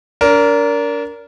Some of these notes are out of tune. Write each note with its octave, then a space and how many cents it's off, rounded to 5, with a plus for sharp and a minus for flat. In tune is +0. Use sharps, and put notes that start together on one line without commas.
D4 -35 A#4 +0